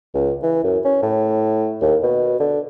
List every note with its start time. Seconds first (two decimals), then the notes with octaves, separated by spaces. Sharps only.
0.14 C#2
0.43 E3
0.64 F#2
0.84 C#4
1.02 A2
1.81 D#2
2.03 B2
2.39 D3